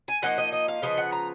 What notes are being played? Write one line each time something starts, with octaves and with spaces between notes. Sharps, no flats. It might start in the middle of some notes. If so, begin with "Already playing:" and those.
G#5
F3 A#3 D#4 F#5
D#5
D#5
F5
C#3 F3 B3 D#5
F#5
A#5